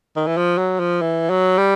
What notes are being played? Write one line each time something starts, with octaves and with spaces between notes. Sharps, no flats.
D#3
E3
F3
F#3
F3
E3
F#3
G3